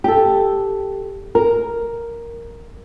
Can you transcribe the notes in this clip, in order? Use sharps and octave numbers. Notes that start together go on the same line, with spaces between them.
G4 A4
A#4